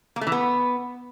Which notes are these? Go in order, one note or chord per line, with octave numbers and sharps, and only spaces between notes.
A#3
A3
E3
B3